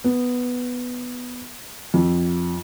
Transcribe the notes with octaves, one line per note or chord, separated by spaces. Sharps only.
B3
F2